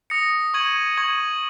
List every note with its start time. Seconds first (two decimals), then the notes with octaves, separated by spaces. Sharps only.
0.10 D#6 A#6 C#7
0.54 C#6 G#6 D#7 F#7
0.97 C#6 G#6 D#7 F#7